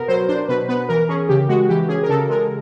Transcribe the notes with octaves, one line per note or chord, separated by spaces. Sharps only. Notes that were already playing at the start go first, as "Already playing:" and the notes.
Already playing: B2 B3 A#4 B4
F#3 C5
D4 C5
B2 B4
B3 B4
E3 A#4
C#4 G#4
C#3 G4
G#3 F#4
E3 G4
C#4 G#4
A#4
C#3 A4
G#3 A#4